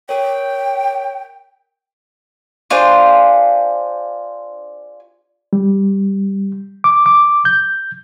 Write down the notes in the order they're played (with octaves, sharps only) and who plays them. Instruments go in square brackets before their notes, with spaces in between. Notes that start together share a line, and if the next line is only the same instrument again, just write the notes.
[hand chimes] A#4 C#5 [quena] G5
[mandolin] D4 F4 G#4 C5
[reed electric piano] G3
D6
D6
G6